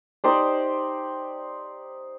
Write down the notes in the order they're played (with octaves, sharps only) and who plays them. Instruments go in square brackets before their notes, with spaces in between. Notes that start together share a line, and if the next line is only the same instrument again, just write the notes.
[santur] D#4 G4 C5 D5